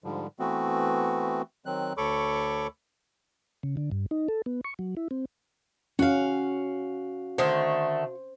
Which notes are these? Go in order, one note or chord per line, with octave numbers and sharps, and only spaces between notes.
G#2 D3 F3 G3
E3 A3 B3 C4 F#4
D#3 F#3 C4 F#6
D2 A4 C#5 B5 C#6 D6
C#3
D3
G2
D#4
A4
B3
C#6
F#3
E4
C4
C#4 F#4 F5
D3 D#3 A3 C5